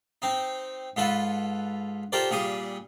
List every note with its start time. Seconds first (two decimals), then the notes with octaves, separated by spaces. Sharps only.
0.22 C4 D#4
0.96 G#2 F4 A4 B4 F#5
2.12 F4 G4 A4 A#4 C5 D5
2.31 A#2 G3 G#4 D#6